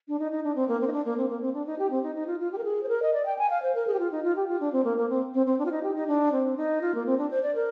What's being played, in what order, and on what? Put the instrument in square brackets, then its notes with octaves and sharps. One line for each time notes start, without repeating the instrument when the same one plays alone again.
[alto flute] D4
D#4
D#4
D4
C4
A#3
C4
D#4
D4
A#3
C4
A#3
C4
D4
D#4
G4
C4
D#4
D#4
F4
F4
G4
A#4
G#4
C5
A#4
D#5
D5
G5
G#5
F5
C5
A#4
G#4
G4
F4
D#4
F4
G4
F4
D4
C4
A#3
A#3
C4
C4
C4
D4
F4
D#4
G4
D#4
D4
C4
D#4
F4
A#3
C4
D4
C5
D5
A#4